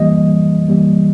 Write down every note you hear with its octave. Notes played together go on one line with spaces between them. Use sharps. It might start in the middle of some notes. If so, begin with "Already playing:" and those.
Already playing: E3 G3 A#3 D#5
E3 G3 A#3